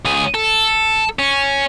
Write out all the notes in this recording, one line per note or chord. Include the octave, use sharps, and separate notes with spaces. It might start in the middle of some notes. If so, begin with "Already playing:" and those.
C#2 G#4
A4
C#4